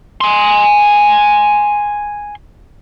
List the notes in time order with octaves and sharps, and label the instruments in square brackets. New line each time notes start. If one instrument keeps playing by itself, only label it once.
[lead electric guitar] G#5 C6